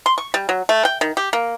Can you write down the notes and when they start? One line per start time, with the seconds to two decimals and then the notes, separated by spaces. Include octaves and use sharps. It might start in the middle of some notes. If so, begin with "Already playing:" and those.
0.06 C6
0.18 C#6
0.34 G3
0.49 F#3
0.69 A3
0.85 G5
1.01 D#3
1.17 G4
1.33 A#3